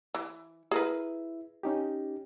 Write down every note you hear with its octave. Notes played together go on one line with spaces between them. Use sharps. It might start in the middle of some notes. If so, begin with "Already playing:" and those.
E3
E4 G#4 A#4 B4 E5
C#4 D#4 G4